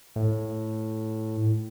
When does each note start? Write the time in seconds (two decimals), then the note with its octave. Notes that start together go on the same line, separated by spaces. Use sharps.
0.16 A2